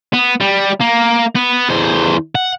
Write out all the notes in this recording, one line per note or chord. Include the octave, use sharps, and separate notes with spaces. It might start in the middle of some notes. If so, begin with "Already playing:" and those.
B3
G3
A#3
B3
E2 C5
F#5